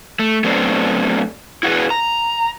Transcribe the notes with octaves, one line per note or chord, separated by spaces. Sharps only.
A3
F#3 A3 B3 C4 D4
E4 F#4 G#4 B4
A#5